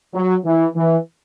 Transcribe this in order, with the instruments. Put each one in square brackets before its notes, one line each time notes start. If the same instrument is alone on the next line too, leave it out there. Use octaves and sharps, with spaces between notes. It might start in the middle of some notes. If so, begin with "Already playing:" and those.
[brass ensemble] F#3
E3
E3